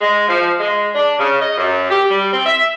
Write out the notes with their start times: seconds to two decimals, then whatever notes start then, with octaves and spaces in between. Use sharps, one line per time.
0.01 G#3
0.29 F3
0.60 G#3
0.95 D4
1.19 C#3
1.41 D#5
1.58 F#2
1.90 G4
2.10 G3
2.33 C4
2.46 E5